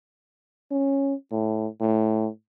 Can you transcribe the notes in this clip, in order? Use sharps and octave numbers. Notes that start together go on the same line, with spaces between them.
C#4
A2
A2